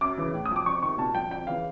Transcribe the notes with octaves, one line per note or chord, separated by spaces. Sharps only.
F#2 D6
C#3 E3
A2
F3 D#6
D6
F2 C#6
C3 D#3 C#6
A#2 A5
F3 G5
F2 G5
C#3 E3 F5